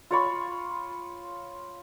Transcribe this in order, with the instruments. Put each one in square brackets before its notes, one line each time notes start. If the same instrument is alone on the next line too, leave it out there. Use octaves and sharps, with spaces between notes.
[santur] F4 C#5 B5